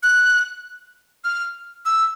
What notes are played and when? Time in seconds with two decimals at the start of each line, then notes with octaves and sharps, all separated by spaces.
0.03 F#6
1.24 F6
1.86 E6